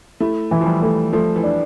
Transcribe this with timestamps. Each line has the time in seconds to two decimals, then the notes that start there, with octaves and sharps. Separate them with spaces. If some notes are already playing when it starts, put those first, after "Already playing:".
0.20 A3 E4
0.51 E3
0.61 F3
0.66 G3
0.82 A3
1.13 F3 A3
1.36 E3
1.44 D4